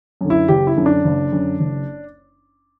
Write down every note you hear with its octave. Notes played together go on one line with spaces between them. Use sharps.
F#2 D3
E4
F#1 G4
E4
F#2 D3
D4
F#1
F#2 D3
F#1